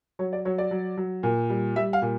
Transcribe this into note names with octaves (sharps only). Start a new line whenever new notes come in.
F#3 C#5
D5
F#3 C#5
D5
F#3
F#3
A#2
G3
G3 E5
F5
A#2